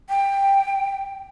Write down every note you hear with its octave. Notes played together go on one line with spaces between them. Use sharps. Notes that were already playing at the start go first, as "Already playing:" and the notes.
G5